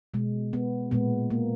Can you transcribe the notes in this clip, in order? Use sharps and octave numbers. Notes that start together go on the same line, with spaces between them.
B2 G#3
B3
A#2 G#3 B3
A#3